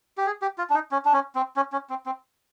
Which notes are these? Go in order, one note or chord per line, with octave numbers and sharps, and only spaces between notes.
G4
G#4
G4
F4
D4
D#4
C#4
D4
C#4
C4
C#4
C#4
C4
C4